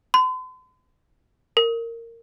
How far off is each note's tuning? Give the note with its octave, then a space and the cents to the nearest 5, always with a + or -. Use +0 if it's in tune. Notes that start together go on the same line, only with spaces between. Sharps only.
C6 -45
A#4 -15